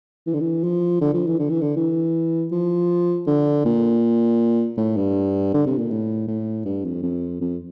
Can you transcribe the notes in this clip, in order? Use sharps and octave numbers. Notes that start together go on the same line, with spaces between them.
E3
D3
E3
F3
D3
F3
E3
D3
E3
D3
E3
F3
D3
A#2
A2
G2
D3
C3
A#2
A2
A2
G2
F2
F2
F2